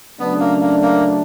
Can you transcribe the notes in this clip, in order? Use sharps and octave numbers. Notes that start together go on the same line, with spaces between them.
C#3 F#3 A3 B3 D4
A#3
A#3
A#3